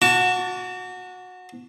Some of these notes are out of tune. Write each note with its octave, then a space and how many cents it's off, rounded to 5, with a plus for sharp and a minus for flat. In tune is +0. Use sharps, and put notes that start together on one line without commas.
F#4 -20 A5 +15 D6 -45